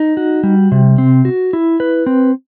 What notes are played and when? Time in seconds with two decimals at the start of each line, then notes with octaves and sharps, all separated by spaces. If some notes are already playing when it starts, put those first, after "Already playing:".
Already playing: D#4
0.17 F#4
0.43 G3
0.72 C3
0.98 C4
1.25 F#4
1.53 E4
1.80 B4
2.06 C4